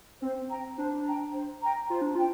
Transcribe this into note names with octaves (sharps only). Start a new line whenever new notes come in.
C4 C5
G5 A#5
D4 C5
G5 A#5
C5
G5 A#5
F4 C5
D4
F4 G5